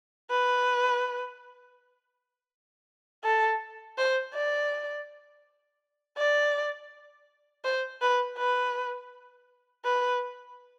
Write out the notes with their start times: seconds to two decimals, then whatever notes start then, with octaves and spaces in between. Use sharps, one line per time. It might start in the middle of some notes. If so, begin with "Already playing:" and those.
0.30 B4
3.24 A4
3.98 C5
4.34 D5
6.18 D5
7.65 C5
8.02 B4
8.38 B4
9.85 B4